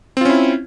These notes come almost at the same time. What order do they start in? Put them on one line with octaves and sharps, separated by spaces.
C4 F4 C#4 E4